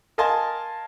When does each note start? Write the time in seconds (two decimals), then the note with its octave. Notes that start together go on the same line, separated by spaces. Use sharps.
0.18 A#4 D#5 F5 G#5 A5 C6